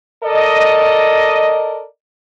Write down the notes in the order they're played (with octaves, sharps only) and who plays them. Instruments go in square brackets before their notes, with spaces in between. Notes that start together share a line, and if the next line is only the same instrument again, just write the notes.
[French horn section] A4 A#4 D5 D#5